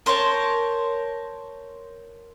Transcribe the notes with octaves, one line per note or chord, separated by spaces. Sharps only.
A#4 C5 C#5 A5